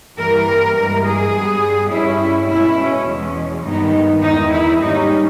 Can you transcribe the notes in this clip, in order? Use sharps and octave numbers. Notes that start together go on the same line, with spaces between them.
G2 E3 G3 A#3 A#4
G2 E3 G#3
G#4
G2 G3 B3
G2 G3 C#4 E4
B2 G#3 C#4 E4
C#4
E2 B2 G#3 C#4
G2 D#3 G#3 B3 D#4
E2 D#3 G#3 D#4
E4
G#2 G3 A#3 C#4 D#4